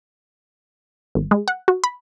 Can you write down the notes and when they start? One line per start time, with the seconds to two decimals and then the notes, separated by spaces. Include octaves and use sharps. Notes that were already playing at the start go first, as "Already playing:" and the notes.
1.15 G#1
1.31 G#3
1.48 F#5
1.68 F#4
1.84 B5